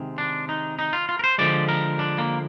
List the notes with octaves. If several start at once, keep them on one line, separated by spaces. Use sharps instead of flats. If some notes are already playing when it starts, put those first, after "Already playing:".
Already playing: C3 D#3 G#3
D4
D#4
D#4
F4
F4
A#4
C5
D3 F3 G#3 D5
A#4
D4
A#3